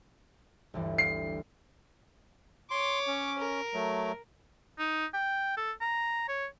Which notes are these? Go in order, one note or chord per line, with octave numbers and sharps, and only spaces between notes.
G1 D2 E3
C7
C#5 C6 D6
C#4
A#4
F#3 A3
D#4
G5
A4
A#5
C#5